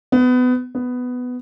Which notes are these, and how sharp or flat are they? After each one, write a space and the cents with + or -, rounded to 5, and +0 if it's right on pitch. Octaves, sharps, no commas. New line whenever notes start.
B3 +25
B3 +10